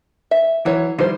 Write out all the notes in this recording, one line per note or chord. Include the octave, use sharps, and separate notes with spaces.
E5
E3 F#3 C#5
D#3 F3 G3 E4 C5